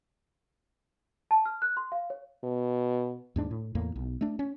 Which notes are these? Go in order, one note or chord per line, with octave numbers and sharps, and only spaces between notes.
A5
F6
F#6
C6
F5
C#5
B2
D#2 G#2 D4
A2
E2 A2 A#3
B1
A3 D4
C#4